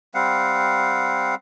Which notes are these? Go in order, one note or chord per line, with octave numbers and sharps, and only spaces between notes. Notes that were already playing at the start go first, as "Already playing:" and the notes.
G3 C4 F5 F#5